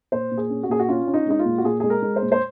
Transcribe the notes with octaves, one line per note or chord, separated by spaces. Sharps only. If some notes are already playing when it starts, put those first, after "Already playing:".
A#2 C5
A#2
G#4
C#4
F#4
A#2 G#4
F#4
C#4 F4
C#4
D#4
G#3 D#4
F4
A#2
F#4
A#2 G#4
G#3 G#4
A#4
G#3
C5
A#2
C5